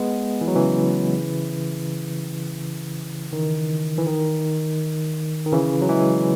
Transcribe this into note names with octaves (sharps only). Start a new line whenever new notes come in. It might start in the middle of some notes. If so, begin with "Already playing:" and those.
Already playing: G#3 B3
E3
F#3
C#3 E3
D#3
E3
D#3
D#3
C#3 E3
F#3
E3 G#3